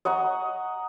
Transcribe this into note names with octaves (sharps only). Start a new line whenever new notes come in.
D#5 F#5 A#5 C#6